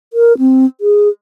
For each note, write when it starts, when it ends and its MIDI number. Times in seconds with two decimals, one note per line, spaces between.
0.13 0.37 70
0.39 0.66 60
0.81 1.09 68